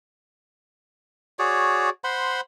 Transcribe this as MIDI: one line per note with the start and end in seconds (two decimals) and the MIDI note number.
1.39 1.90 66
1.39 1.90 68
1.39 1.90 73
1.39 1.90 74
2.04 2.41 72
2.04 2.41 78
2.04 2.41 83
2.04 2.41 84